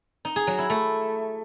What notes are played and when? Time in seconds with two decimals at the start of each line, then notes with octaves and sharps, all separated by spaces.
0.25 D#4
0.36 G#4
0.47 F#3
0.58 E4
0.70 A3